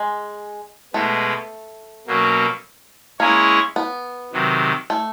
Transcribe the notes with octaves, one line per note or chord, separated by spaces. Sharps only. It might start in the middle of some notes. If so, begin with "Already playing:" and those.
Already playing: G#3
B2 G#3 A3 B3
B2 F#3 A#3 C#4
G#3 A#3 C#4 E4 G#4 C#5
B3
C3 D#3 F#3
A3